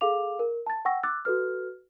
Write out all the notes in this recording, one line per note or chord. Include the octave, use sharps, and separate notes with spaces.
G#4 A4 F5 D6 F7
A#4
A5 A6
F#5 G5 C#6 E6 A#6
D6 E6 F#6 A6
F#4 A4 B4 F6